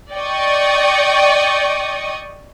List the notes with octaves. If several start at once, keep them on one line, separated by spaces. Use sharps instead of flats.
D5 D#5 G5 C#6 D#6